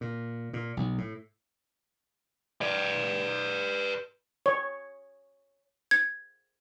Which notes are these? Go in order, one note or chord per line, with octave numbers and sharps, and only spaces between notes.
A#2
A#2
B1
A2
B4 D5
C#5
G#6